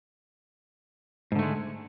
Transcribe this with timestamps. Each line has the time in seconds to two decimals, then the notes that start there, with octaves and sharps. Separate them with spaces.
1.32 G#2
1.35 D3
1.39 A3
1.43 G#3